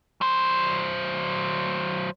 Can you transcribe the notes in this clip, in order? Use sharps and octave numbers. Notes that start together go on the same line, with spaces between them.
F#3 C5